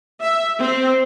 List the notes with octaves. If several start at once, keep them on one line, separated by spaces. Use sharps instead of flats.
E5
C4